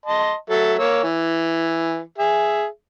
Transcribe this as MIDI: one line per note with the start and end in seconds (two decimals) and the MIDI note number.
0.06 0.34 75
0.06 0.34 81
0.06 0.34 84
0.50 0.74 54
0.50 0.74 69
0.50 0.74 76
0.79 1.03 58
0.79 1.03 73
0.79 1.03 88
1.04 2.00 52
2.18 2.65 68
2.18 2.65 76